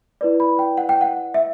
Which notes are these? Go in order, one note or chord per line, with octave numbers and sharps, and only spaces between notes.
E4 B4 D5
B5
G5
F#5
G5
F#5
E5